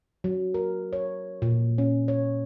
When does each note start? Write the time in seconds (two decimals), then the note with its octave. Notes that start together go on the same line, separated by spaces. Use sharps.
0.24 F#3
0.54 A#4
0.93 C#5
1.42 A#2
1.78 C#4
2.08 C#5